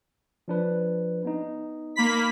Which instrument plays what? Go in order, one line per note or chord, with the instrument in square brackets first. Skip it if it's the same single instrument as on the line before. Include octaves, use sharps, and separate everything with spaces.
[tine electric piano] F3 D4 B4
B3 D#4
[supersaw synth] A#3 B5 B6